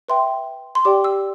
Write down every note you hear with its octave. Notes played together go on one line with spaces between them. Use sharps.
B4 E5 G5 C6
C6
G4 D5 G5 D6
E6